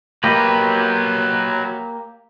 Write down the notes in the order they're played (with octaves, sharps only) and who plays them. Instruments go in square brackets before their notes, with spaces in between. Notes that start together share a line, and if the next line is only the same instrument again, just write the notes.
[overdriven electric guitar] F#3 B4 [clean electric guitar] A#3 G4 D#5